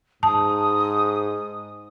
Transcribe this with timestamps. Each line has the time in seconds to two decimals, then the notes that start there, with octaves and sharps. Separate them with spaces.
0.23 G#2 A5 D#6